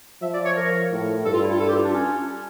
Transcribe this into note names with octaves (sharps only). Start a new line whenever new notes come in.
F3 E5
D5
C#5
A#4
A2
G2 A4
F4
E4
F4
A4
G4
F4
D4
C#4